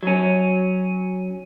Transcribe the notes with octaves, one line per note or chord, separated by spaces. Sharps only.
F#3 C#4